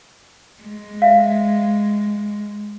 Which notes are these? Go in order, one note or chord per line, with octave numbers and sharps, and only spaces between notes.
G#3
E5 F5